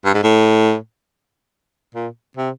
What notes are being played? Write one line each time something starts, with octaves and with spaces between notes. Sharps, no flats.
G2
G#2
A2
A#2
C3